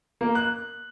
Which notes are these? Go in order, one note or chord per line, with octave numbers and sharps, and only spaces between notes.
A#3
F#6